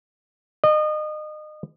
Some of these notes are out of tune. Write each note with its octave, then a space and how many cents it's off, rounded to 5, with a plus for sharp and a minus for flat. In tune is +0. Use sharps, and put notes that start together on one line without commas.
D#5 -30